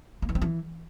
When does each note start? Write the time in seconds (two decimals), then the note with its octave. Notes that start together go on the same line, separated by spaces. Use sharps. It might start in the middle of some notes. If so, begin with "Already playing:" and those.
0.22 A#3
0.29 E3
0.35 C4
0.42 E3